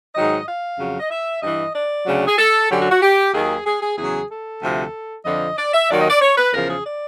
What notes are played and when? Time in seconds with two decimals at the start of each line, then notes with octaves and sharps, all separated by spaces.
0.15 G#2 D#3 F#3 D#5
0.47 F5
0.79 F2 C#3 F#3
1.00 D#5
1.10 E5
1.42 G2 E3 D#5
1.74 D5
2.06 D2 C#3 F#3
2.27 G#4
2.38 A4
2.70 F#2 D3 F#3 G4
2.80 F#4
2.91 F#4
3.02 G4
3.34 D#2 D#3 F#3 G#4
3.66 G#4
3.81 G#4
3.97 E2 C#3 F#3 G#4
4.30 A4
4.62 D2 C3 F3
5.25 F2 D3 F3 D#5
5.57 D5
5.73 E5
5.89 D#2 D#3 F#3 D5
6.00 D#5
6.10 D5
6.21 C#5
6.37 B4
6.53 E2 C#3 F3 A#4
6.69 G#4
6.85 D5